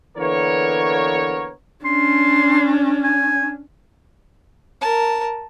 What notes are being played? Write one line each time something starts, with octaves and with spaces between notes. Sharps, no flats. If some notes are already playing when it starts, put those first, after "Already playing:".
D3 E3 A#3 B3 A#4 C#5
C#4 D4 C6
G#5
A#4 A5